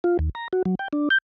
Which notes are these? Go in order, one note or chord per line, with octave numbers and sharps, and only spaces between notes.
F4
D#2
A#5
F#4
F#3
G5
D4
G6